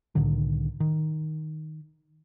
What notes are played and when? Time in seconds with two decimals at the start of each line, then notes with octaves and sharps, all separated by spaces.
0.15 C2 A2 D3 D#3
0.80 D#3